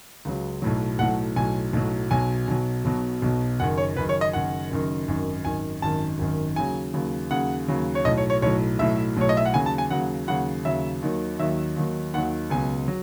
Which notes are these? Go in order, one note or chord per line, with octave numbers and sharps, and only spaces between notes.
C#2 C#3 F#3
B1 A2 F#3
B1 A2 F#3 F#5
B1 A2 F#3 G#5
B1 A2 F#3
B1 B2 F#3 G#5
B1 B2 F#3
B1 B2 F#3
B1 B2 F#3
F#1 F#2 D#3 F#5
C#5
F#1 F#2 D#3 B4
C#5
D#5
F#1 F#2 D#3 F#5
F#1 F#2 D#3
G#1 F#2 D#3
G#1 F#2 D#3 G#5
G#1 F#2 D#3 A5
G#1 F#2 D#3
D#2 C#3 F#3 G#5
D#2 C#3 F#3
D#2 C#3 F#3 F#5
D#2 C#3 F#3
C#5
B1 A2 F#3 D#5
C#5
C#5
B1 A2 F#3 C#5
B1 A2 F#3 E5
B1 A2 F#3 C#5
D#5
E5
F#5
D#2 C#3 F#3 G#5
A5
G#5
D#2 C#3 F#3 F#5
D#2 C#3 F#3 F#5
D#2 C#3 F#3 E5
D#2 D#3 F#3
D#2 D#3 F#3 E5
D#2 D#3 F#3
D#2 D#3 F#3 F#5
C#2 B2 F#3 G#5
F#3